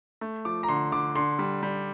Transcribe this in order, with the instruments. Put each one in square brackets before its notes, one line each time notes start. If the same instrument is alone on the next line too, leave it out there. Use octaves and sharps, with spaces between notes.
[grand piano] A3
F3 D6
A#5
D3 C6
D3 D6
D3 C6
G3
G3